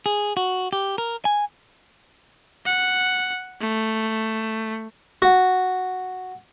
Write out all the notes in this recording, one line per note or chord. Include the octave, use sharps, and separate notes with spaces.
G#4
F#4
G4
A#4
G#5
F#5
A3
F#4